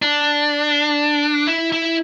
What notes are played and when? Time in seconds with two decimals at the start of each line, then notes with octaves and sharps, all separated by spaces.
0.02 D4
1.47 E4
1.72 E4